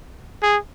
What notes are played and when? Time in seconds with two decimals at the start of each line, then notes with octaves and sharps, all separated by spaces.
0.42 G#4